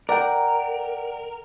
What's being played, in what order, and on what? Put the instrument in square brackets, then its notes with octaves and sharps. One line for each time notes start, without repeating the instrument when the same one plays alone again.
[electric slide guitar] A#4 [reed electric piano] D5 F#5 G5